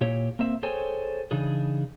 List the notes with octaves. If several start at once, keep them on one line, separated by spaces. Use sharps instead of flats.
A#2 E4 G4 C#5
A#3 C4 E5
G#4 A4 C5 C#5 G5 G#5
C#3 E3 D4 D#4 G#4